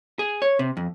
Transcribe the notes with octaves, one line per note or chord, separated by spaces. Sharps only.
G#4
C#5
C3
F2